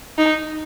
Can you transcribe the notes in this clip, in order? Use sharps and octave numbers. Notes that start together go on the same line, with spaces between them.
D#4